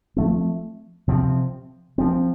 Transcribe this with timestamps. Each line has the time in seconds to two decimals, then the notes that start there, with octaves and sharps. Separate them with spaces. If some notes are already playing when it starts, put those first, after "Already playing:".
0.16 F3 A3 C4
1.08 C3 F3 C4
1.98 F3 C4